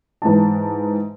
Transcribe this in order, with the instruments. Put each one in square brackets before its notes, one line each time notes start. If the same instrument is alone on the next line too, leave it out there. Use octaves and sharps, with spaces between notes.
[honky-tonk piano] G#2 E3 A5